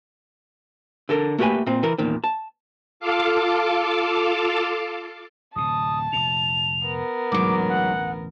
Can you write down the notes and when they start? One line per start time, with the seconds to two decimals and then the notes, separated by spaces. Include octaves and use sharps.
1.09 D3 A4 A#4
1.38 A3 A#3 F#4 G4 B4 G#5
1.66 A#2 C4
1.83 E3 A#4
1.98 E2 A#2 D#3
2.24 A5
3.00 F4 A4 F5 A5 D6
5.56 D1 C3 A5 D#6
6.13 F1 A#2 F7
6.86 B3 A#4
7.32 A1 D2 G#2 B2 F#3 D6
7.69 F#5